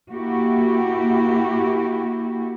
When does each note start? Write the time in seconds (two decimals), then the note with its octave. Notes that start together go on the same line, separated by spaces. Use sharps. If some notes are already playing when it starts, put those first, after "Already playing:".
0.12 A#3 E4 F#4 G4